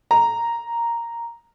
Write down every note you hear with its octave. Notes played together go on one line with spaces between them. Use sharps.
A#5